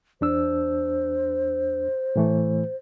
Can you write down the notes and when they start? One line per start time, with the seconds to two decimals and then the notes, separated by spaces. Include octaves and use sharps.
0.21 E2 D4 C5 E6
2.16 A2 E3 A3